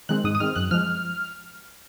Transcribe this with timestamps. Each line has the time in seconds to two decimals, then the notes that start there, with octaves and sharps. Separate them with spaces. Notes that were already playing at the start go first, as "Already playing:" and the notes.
0.09 D#3 G#3 C4 F#6
0.24 G#2 D#6
0.35 D#6
0.40 D#3 G#3 C4 F6
0.56 F#2 F#6
0.71 F3 G#3 F6